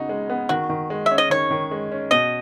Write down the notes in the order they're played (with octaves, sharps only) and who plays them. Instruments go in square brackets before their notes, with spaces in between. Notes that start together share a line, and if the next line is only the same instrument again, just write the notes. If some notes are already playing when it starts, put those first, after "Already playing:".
Already playing: [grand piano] C#3 B3 D#4 [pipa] F#4
[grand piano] G#3
B3
[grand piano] D#3 [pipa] F#4
[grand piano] D#3
G#3
[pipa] E5
[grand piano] C#4
[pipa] D#5
[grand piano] D#3 [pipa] C#5
[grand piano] D#3
G#3
C#4
[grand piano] B2 [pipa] D#5